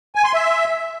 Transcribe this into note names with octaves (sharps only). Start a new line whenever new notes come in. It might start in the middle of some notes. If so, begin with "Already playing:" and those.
G#5
C6
E5